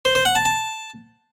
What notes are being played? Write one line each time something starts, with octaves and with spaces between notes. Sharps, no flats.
C5
C5
F#5
A5
A5